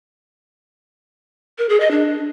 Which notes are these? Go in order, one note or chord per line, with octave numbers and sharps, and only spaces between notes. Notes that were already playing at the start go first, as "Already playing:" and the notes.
A#4
G#4
D#5
D4